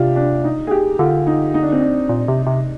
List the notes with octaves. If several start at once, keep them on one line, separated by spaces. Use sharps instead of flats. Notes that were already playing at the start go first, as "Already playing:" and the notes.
Already playing: C3 D4 F4 G4
D4
D#4
G#4
G4
D3 F4
D#4
D#4
D4
C4
D4
A#2
C3
C3